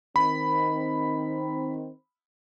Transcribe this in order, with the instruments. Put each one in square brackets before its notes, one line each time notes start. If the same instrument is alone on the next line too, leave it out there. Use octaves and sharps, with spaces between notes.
[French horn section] D#3 C4 [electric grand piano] B5